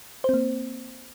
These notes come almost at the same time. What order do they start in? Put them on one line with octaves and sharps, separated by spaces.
C5 C4 A#3